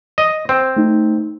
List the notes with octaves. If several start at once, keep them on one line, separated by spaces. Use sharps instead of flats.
D#5
C4
A3 D#4